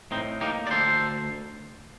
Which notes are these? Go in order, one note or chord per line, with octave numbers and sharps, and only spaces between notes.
A2 C4 D#4
A#3 D#4 G4
D5
D2 A4 C5